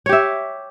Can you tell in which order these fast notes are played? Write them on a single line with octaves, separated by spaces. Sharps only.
C#5 G4 E5